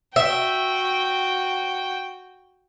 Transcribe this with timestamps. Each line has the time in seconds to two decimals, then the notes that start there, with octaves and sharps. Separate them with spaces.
0.16 F#4 E5 G5